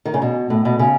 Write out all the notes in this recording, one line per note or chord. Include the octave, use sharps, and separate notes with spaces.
D#3
C#3
B2
A2
B2
C#3